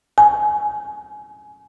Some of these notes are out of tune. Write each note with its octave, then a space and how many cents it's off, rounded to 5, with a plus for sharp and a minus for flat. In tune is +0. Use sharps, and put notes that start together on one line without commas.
G#5 +20